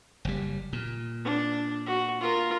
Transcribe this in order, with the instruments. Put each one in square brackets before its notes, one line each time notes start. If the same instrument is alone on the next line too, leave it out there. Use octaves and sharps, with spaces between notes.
[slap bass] F#1 G3
A#2
[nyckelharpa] D4
F#4
F4 A#4